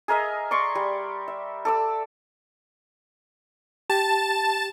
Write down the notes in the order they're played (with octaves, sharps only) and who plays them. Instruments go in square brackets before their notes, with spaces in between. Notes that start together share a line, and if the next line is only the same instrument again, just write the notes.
[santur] G#4 A#4 D#5 E5
D5 C6 C#6
G3
E5
A4 D5 E6
[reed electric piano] G4 [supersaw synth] A5